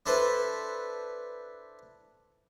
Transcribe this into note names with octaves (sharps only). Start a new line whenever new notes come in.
D4 E4 A4 B4 C5